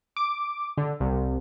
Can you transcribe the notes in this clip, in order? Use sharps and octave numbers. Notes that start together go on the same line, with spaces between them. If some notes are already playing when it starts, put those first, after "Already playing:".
D6
D3
C2